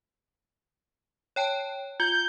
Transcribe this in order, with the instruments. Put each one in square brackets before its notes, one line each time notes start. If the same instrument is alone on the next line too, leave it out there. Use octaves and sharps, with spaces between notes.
[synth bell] C#5 G5 A5
[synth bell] F4 [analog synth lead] G6